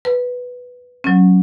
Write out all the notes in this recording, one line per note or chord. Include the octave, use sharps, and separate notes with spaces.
B4
F#3 C#4